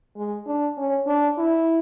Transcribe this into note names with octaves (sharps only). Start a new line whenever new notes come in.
G#3
D4
C#4
D4
E4